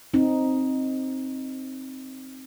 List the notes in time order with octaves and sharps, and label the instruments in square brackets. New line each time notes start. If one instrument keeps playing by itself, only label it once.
[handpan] C4 D#4